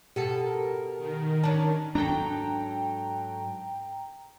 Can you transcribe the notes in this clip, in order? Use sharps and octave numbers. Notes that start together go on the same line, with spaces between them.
B2 G4 A4
A#4
D#3
C#4 D4 A5
G#2 F#3 D4 A4 G5 A#5